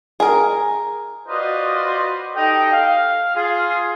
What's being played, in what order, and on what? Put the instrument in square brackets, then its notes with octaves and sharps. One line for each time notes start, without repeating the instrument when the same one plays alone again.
[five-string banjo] G#4 A#4
[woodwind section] F4 F#4 B4 C5 D5 D#5
D#4 G4 A4 D#5 G5
F5
F4 G#4